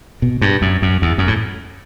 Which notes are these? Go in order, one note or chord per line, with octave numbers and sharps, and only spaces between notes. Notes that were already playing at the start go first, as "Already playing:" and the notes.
B2
G2
F#2
F#2
E2
F#2
A2